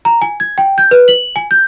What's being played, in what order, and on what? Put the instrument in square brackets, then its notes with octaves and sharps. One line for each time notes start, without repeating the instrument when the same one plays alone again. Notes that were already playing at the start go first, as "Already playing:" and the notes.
[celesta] A#5
G#5
G#6
G5
G6
B4
F#7
G#5
G6